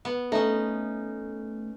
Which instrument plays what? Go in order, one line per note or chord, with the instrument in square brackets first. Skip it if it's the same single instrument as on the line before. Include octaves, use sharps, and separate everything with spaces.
[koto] B3
[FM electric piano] A3 [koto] C#4 D#4